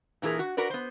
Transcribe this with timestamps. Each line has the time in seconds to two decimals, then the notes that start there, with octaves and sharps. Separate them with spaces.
0.22 A#2 E3 G#3 G#4 A#4
0.39 F#4
0.57 F#4 A#4 B4 D5
0.70 B3 C5